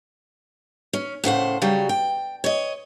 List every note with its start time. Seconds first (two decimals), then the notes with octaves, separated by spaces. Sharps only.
0.93 C#4
1.24 A2 C#3 C5 F#5
1.62 C#3 F#3 G3
1.89 G5
2.44 C#5 D#5